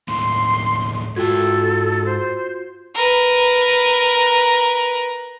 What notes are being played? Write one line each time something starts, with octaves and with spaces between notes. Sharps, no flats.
D#2 A2 C6
G#2 F4 F#4 A4 G5 G#6
C5
A#4 B4